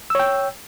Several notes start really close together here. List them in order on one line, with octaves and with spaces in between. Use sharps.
E6 C#5 G5